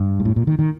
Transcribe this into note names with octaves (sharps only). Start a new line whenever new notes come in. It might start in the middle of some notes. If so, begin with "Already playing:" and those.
Already playing: G2
G#2
A2
A#2
D#3
D#3